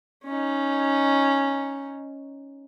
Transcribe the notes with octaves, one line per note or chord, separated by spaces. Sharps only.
C#4 D#4